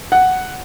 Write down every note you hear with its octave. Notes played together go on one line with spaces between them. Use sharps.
F#5